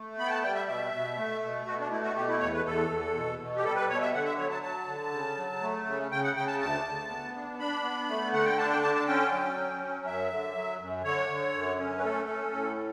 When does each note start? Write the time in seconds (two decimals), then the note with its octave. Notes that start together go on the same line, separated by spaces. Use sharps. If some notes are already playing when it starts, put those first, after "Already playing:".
Already playing: A3
0.18 B3 B5
0.26 G5
0.30 A5
0.42 G3 G5
0.55 E5
0.67 B2 E5
0.93 B2
1.17 A3
1.42 B2
1.66 B2 F#4
1.79 D4
1.91 A3 E4
2.04 F#4
2.16 B2 G4
2.28 E4
2.40 E2 C#5
2.53 B4
2.65 E2 A4
2.90 E2
3.15 B2
3.40 B2
3.56 G4
3.64 G3 A4
3.76 B4
3.89 B2 C#5
4.01 E5
4.14 D3 F#5
4.25 E5
4.38 F#3 C#5
4.50 A5
4.62 F#3 A5
4.87 D3
5.12 C#3
5.37 F#3
5.61 A3
5.86 C#3
6.11 C#3 G5
6.23 F#5
6.36 C#3 G5
6.48 A5
6.60 D2 A5
6.84 D2
7.09 B3
7.35 D4
7.59 D4 B5
7.83 B3
8.09 A3
8.32 D3 F#5
8.45 G5
8.58 D4 A5
8.70 G5
8.82 D3 A5
8.95 A5
9.07 C#4 G5
9.31 F#3
9.57 C#4
9.81 F#3
10.06 F#2 E5
10.30 D3
10.55 F#3
10.80 F#2
11.04 D3 C#5
11.29 D3
11.54 F#2
11.78 C#4
11.98 B4
12.03 A3 A4
12.28 C#4
12.52 A2